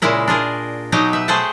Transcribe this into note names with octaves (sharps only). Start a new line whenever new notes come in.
A#2 C#3 G#3 E4 A#4
D4 F4 G#4 A#4
B2 F#3 D#4 G4 A#5
B4 E5
A3 G#4 C5 F#5 G5 A5